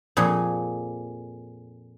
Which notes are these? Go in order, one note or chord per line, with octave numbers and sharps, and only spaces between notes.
F2 A#2 G#4